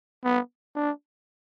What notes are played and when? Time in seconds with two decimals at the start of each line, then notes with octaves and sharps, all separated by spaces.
0.25 B3
0.76 D4